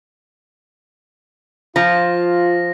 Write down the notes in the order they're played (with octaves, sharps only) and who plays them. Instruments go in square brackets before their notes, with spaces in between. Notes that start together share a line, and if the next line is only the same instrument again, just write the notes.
[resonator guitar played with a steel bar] F3 [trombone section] F4 [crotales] A#6